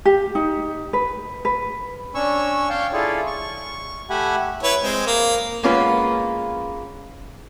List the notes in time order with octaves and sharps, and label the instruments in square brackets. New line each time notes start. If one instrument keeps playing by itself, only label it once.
[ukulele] G4
D#4
B4
B4
[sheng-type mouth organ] C#4 D4 C#5 C#6 E6
C#5 F5 G5 A5
E4 F4 G#4 A4 D5
C#6
A3 G4 E5 F#5 G#5 B5
[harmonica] E4 B4 C#5
G#3 C4
A#3
[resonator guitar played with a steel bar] G#3 A#3 B3 C#4 F4 B4